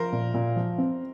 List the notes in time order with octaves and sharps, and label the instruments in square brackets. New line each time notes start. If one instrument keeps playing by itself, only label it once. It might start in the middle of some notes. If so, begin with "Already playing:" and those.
Already playing: [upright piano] F3 [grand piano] A#4 C5
[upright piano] A#2
A#2
F3
C4